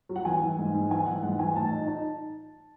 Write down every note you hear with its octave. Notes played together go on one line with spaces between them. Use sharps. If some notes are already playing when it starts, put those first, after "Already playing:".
F#3
F#5
E3 G#5
E3
G#2
G#2
E3 G#5
E3 F#5
G#2 F#5
E3 G#5
A2 A5
D#4
D#4